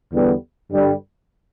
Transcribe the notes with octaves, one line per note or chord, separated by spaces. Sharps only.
E2 D3 G3 B3
G2 D3 G3